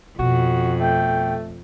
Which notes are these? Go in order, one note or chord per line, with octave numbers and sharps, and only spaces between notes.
F2 B2 F#4
A3 G5